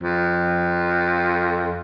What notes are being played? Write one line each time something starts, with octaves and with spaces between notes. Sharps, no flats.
F2